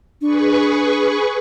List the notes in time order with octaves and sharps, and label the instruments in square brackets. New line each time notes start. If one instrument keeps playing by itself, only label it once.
[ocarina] D4 [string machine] G#4 B4 C#6